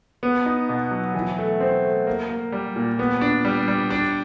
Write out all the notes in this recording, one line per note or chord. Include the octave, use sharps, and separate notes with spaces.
B3
D#4
B2
F#3
E3
A3
C4
A3
A#3
A#3
G3
A#2
B3
D4
G3
G3
D4